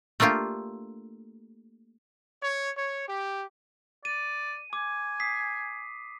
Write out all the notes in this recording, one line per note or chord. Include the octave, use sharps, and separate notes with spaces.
A3 A#3 D4 F4 G4
C#5
C#5
G4
D5 D#7
G#5 D6
D#6 B6 C7